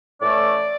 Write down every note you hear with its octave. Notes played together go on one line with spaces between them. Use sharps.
A2 E3 A3 C#4 D5